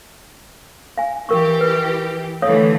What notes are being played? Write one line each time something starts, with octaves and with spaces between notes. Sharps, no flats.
F5 G#5
E3 G4 A#4 C#6
B4
D3 E3 A3 C#5 F5 D#6